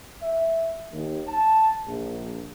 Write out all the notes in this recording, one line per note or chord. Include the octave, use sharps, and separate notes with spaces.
E5
D#2
A5
A#1